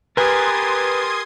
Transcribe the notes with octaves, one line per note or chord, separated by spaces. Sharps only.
G4 A#4 B4 G#5 C6 D#6 G#6 A6